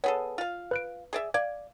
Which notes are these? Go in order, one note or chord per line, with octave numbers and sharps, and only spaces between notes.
B3 G#4 A4 C#5
F4 F5
B4 F#6 D7
G#4 D5 E5
D5 F5 G#6